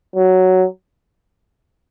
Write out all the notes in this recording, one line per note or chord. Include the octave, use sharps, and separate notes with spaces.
F#3